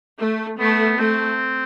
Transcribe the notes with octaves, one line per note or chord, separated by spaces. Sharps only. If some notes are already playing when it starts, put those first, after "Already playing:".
A3
A3 B3
A3 C4